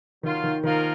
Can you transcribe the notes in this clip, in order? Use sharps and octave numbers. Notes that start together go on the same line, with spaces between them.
D#3 F#3 A#3 F4
D#3
D#3 F3 A#3 F4 A#4